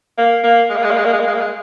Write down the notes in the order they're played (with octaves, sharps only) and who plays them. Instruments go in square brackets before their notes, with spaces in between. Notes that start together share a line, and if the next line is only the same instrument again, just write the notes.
[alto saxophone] A#3
A#3
G#3
A#3
G#3
A#3
G#3
A#3
G#3
A#3
G#3
A#3
G#3